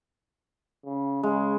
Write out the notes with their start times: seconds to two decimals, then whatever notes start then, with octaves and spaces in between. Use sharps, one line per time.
0.85 C#3
1.23 C#3 G#3